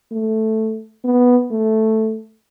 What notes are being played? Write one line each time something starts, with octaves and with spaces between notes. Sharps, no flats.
A3
B3
A3